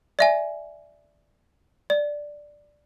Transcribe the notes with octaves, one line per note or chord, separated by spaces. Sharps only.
D5 E5 G#5
D5